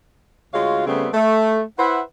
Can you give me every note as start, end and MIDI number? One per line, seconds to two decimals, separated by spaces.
0.53 0.85 38
0.53 0.85 56
0.53 0.85 65
0.53 0.85 66
0.53 0.85 73
0.53 0.85 77
0.86 1.09 49
0.86 1.09 55
0.86 1.09 57
0.86 1.09 59
0.86 1.09 60
1.14 1.61 57
1.79 2.00 64
1.79 2.00 71
1.79 2.00 72
1.79 2.00 76
1.79 2.00 78